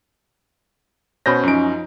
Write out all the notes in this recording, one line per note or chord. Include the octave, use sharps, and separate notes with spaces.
B2 C#4 C5 B5 G6 A#6
F#2 F3 C#4 D#4 D7